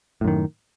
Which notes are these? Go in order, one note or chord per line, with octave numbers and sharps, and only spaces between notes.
F#2 A2 D#3